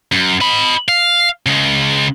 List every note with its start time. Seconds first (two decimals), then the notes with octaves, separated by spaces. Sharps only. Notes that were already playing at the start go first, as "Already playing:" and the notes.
0.12 F#2
0.41 D#5 B5
0.89 F5
1.46 C#3 G#3